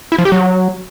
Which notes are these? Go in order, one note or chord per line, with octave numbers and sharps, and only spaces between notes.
E4
F3
G4
F#3